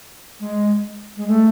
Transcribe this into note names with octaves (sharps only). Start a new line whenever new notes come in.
G#3
G#3
A3